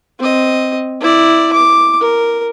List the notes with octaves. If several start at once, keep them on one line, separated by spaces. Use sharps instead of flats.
C4 D#5
E4 D5
D6
A#4